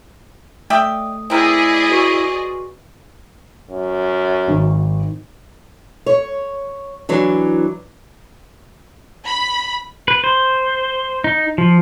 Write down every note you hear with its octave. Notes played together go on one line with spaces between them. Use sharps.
A3 D5 E5 G5 D#6
C4 E4 G#4 A#4 D5 D#5
F#4 B4 C#6
F#2
G#1 D#3
C#5
E3 F#3 D4
B5
B4
C5
D#4
F3